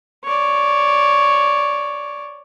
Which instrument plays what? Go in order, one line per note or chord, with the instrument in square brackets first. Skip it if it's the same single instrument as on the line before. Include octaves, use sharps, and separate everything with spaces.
[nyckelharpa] C#5 D5